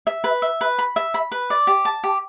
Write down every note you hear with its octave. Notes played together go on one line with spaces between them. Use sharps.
E5
B4
E5
B4
B5
E5
B5
B4
D5
G4
A5
G4